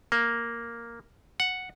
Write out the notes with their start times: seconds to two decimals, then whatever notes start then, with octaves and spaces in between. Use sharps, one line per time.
0.12 A#3
1.40 F#5